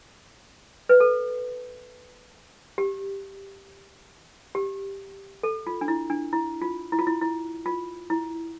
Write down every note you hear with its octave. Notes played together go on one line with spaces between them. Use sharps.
B4
A4
G4
G4
A4
F4
D4
E4
D4
E4
F4
E4
F4
E4
E4
F4
E4